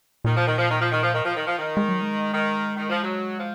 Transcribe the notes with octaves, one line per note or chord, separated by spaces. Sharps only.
A#2 D#3
F3
D#3
F3
D#3
F3
D#3
F3
D#3
F3
D#3
F3
D#3
G#3
F#3
G#3
D#3
D#3
F3
F#3
F3